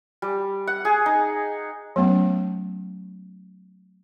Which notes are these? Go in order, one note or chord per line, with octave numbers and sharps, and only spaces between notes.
G3
F#5
G#4
D#4
F#3 A3 B3 C#4